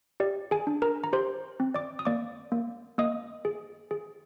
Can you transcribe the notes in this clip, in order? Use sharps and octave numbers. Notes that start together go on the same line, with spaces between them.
G4 D5
G#4 G#5
D4
A#4 A#5
A#5
G4 C5 C6
C4
D5 D6
D#6
A#3 D5 D6
A#3
A#3 D#5 D#6
G#4
G#4